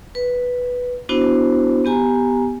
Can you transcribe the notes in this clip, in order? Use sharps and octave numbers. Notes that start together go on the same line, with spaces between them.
B4
B3 D4 E4 F#4 C5
B3 G4 G#5 A#5